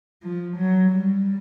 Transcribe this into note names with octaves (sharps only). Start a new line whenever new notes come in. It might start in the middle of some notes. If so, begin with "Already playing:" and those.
F3
F#3
G3